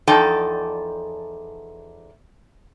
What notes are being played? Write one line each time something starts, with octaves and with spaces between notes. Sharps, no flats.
E2 F3 D#4 A4 D5 G5